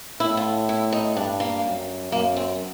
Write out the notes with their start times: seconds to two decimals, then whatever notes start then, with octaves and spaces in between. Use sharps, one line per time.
0.20 A2 E4
0.37 F4
0.69 E4
0.92 D#4
1.16 G2 D4
1.40 A#3
1.64 F#2
2.12 F#2 A#3
2.37 C4